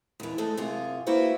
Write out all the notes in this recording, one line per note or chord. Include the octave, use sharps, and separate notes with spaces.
D#2 E3
G#3 A3 A4 D#5
F#2 C3 F4 G#4
A#3 E4 F#4 B4 C5 E5